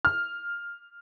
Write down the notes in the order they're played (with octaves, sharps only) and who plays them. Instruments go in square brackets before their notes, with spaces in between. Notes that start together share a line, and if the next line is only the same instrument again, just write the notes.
[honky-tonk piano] F6